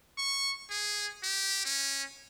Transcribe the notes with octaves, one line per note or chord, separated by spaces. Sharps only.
C#6
G#4
G4
C#4